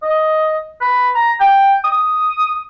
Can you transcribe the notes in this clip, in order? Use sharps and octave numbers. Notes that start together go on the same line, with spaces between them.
D#5
B4
A#5
G5
D#6